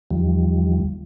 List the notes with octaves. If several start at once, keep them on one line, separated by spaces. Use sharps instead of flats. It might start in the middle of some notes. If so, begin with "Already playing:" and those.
E2 D#3 F3 G3